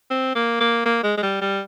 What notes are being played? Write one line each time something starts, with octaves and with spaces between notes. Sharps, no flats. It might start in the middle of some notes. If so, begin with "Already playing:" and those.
C4
A#3
A#3
A#3
G#3
G#3
G3
G3